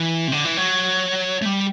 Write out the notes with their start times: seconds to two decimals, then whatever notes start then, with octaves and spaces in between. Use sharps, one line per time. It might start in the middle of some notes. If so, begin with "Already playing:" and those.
Already playing: E3
0.28 C3
0.32 D3
0.45 E3
0.57 F#3
1.42 A3
1.45 G3